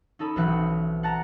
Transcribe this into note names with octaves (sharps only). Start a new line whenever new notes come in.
C#4 D#4 A4 B5
B1 E3 C4 B4 F#5
F#5 A5 A#5